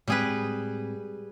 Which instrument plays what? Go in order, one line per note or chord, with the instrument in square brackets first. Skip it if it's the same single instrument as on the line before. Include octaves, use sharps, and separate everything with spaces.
[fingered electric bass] A2 G#3 C4 [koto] G3 G#4 B4